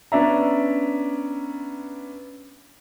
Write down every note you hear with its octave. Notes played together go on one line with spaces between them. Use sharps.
B3 C#4 D4 D5 E5 A#5